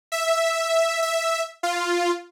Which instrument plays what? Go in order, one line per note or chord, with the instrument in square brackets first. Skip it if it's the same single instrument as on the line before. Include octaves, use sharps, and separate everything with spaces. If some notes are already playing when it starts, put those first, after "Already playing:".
[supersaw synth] E5
E5
F4